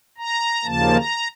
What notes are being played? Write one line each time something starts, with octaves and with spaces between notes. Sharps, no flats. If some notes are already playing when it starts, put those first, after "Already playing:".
A#5
D#2 C#3 F3 A#3 A5
A#5